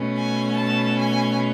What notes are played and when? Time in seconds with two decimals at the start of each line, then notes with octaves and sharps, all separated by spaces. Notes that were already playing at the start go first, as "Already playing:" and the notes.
Already playing: B2 A3 C#4
0.16 G#5
0.57 A5
0.98 G#5